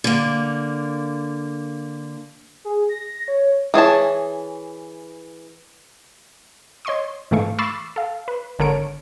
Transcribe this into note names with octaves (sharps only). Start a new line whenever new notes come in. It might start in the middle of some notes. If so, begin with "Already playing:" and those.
D3 A#3
G#4
A#6
C#5
E3 G#4 C#5 A5
C#5 D#5 C6 C#6 D#6
G#2 E3 A3 F5 C#6
B5 C#6 D6 E6 A6 C7
A4 F5
B4
G#1 D3 A#4 C#5 D7